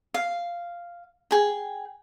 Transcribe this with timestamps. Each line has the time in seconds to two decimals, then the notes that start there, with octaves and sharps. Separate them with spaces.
0.14 F5
1.31 G#4 G5